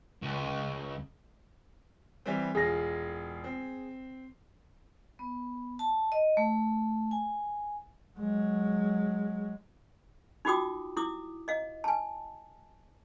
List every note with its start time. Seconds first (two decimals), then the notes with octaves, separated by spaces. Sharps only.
0.22 C#2
2.26 E3 G3 C4
2.55 E1 F4 G#4 A#6
3.44 C4
5.19 B3
5.79 A5
6.12 D#5
6.37 A3
7.11 G#5
8.18 F#3 G#3
10.45 D#4 F4 F#4 G5 D6 D#6
10.97 E4 D6 D#6
11.48 D#5 F5
11.84 G#5 A5